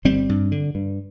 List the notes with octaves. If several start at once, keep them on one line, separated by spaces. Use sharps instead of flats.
G1 G3 C4
G2
D3
G2